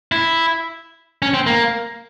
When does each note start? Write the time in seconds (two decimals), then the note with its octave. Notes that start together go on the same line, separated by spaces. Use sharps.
0.12 E4
1.22 C#4
1.34 C4
1.47 A#3